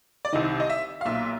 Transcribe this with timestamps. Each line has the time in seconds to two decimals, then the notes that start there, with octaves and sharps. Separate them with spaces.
0.25 D5
0.33 C2 C3 D#3 D#5
0.60 D#5
0.70 E5
1.01 F5
1.05 B1 A#2 E5